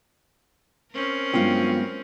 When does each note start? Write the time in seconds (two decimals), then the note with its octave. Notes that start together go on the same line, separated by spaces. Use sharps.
0.92 C4 C#4 A#4
1.33 G2 F#3 G#3 B3 F4 G5